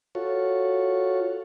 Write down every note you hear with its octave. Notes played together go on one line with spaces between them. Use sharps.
F4 F#4 A4 C#5